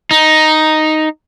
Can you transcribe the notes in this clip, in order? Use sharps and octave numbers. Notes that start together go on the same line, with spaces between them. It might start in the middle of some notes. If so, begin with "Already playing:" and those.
D#4